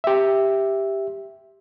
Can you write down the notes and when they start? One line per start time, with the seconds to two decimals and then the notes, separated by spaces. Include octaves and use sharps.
0.04 G4 E5